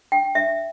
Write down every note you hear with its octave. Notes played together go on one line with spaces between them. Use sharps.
G5
E5